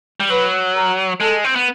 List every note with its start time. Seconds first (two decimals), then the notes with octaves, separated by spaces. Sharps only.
0.20 G3
0.30 F#3 B4
0.75 A#4
1.20 G#3 A4
1.44 C4
1.56 B3